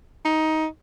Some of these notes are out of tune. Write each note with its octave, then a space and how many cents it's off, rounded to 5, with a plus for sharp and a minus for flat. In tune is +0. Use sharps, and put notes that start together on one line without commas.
D#4 +15